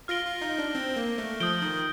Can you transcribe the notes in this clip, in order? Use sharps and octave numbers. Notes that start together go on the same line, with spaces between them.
F4 F6 A#6 D7 G7
F4
D#4
D4
C4
A#3
A3
F3 D#6 G6 D7 G7
D#3